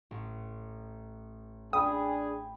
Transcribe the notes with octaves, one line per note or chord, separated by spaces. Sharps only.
A1
D4 G#4 G5 B5 D#6